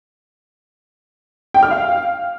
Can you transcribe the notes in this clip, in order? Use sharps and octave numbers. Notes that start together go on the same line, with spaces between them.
G5
F6
F5